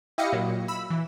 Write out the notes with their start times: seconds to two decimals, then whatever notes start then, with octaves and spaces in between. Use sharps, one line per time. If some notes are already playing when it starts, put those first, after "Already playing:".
0.18 E4 G4 D#5 F5 A#6 C#7
0.33 A#2 F#3
0.68 B5 E6
0.90 E3